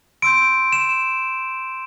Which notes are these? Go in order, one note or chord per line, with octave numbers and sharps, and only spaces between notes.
C6 E6 G6 D7
E7